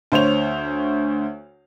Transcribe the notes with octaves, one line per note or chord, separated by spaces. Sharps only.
D2 C5 C#5 F7